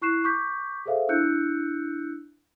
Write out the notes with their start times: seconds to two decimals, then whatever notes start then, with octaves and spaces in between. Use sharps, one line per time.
0.02 E4 C#6 F#6 C7 E7
0.24 C#6 D6 G6 B6
0.86 G#4 A4 C5 E5 F5
1.09 D4 E4 E6 F#6 G6 C#7